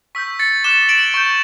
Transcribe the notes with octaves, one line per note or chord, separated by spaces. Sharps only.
C#6 E6 G6 B6
A6 C#7
D6 F#6 E7 G7
D7 F#7
C#6 G6